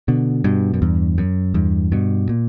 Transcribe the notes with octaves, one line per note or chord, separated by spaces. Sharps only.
B2 D3
G2 B2
F#2
E2 G2
F#2
E2 G2
G2 B2
A#2